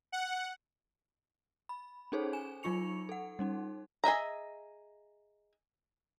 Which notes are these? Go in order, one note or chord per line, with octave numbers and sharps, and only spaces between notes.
F#5
B5
C#4 D#4 G#4 A4 C5 C#5
G#5 E7
F#3 D#4 F4 C#6 C#7 F7
A4 F#5
G3 C#4 D#4
G#4 D#5 E5 A#5